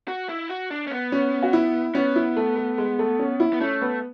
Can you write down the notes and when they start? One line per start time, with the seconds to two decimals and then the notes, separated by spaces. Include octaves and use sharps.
0.08 F#4
0.29 E4
0.49 F#4
0.70 D4
0.87 C#4
0.91 B3
1.12 C#4
1.43 F#4
1.53 E4
1.95 B3 C#4
2.16 E4
2.36 A3
2.57 A3
2.78 G#3
2.99 A3
3.19 C#4
3.40 E4
3.53 B3
3.61 A3 C#4
3.82 B3